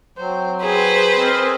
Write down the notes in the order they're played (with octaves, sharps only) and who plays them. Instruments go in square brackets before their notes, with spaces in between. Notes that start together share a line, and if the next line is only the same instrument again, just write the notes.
[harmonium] F#3 C4 [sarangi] C5
[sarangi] G#4 [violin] B4 C5
[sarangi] C4 [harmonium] A#4 D#5 G#5